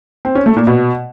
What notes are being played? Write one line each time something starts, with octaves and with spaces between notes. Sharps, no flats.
C4
C#4
A3
A#2
B2